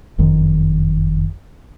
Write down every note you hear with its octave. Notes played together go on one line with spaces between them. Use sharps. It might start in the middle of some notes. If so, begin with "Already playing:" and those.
F#1 F2 D#3